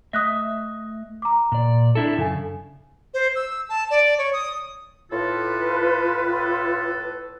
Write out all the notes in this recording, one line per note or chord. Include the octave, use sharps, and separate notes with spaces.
A3 D#5 E5 D#6 F#6 A#6
A#5 D6
A#2 D5
D4 E4 A4
F#2 C#3 A4 G#5
C5
E6
A5
D5
C#5
D#6
A2 F4 A4 B4